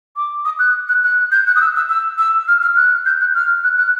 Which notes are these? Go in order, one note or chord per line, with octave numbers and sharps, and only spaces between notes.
D6
D#6
F#6
F#6
F#6
G6
F#6
D#6
E6
E6
E6
E6
F6
F6
F#6
G6
F#6
F6
F#6
F#6